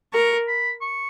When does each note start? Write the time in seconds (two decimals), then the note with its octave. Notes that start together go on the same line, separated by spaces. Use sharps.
0.13 A#4 C#6
0.47 B5
0.81 C#6